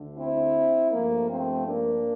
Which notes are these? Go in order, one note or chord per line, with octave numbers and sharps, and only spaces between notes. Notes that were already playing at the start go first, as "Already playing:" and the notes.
Already playing: D2 D3 A3
C4 E4
G2 F3 A3 A#3
A3 C4
A#3 D4